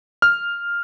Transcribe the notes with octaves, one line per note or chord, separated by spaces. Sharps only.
F6